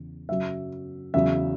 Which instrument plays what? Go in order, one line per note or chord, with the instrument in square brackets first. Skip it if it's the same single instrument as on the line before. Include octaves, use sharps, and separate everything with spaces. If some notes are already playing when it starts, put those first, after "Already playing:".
Already playing: [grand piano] E2 C#3
F#2 C#3 F#3 E5
E2 C#3 F#3 E5